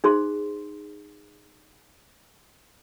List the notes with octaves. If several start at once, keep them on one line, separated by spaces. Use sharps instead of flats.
D#4 G#4 C5 C6